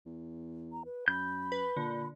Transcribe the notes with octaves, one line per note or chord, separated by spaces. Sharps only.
E2
A#5
B4
F#2 B5 G6
B4
A#2 D3